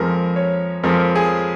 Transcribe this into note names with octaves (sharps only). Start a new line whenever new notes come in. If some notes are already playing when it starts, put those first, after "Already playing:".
Already playing: F2 F3 G#3 A#4
C#5
F2 F3 G#3 A#4
G#4